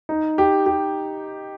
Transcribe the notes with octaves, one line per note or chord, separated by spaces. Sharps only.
D#4
G4
G4